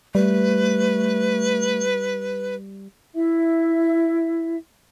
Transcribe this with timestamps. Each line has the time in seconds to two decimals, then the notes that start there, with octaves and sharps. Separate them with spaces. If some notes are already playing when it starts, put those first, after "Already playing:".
0.15 G3 A3 B4
3.15 E4 E5